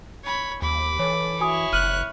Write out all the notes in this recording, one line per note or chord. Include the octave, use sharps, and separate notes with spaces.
C#5 B5
D#2 B5 D6
E3 A4 C#5
E4 F#4 C#5 G#5 D#6
F#1 F6 F#6 D#7 F#7